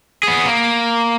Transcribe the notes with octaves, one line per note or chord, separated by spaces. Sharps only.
B3 G#4
A#3